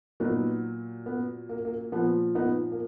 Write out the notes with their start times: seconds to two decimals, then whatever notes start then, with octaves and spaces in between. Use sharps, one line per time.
0.20 A#2 F#3 B3 D#4
1.06 B3
1.49 A#3
1.65 A#3
1.92 A#2 F3 B3
2.35 B3 D#4
2.72 A#3